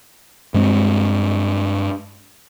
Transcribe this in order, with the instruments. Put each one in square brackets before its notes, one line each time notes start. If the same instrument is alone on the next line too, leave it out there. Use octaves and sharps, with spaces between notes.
[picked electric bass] G2 G#3 A3 C4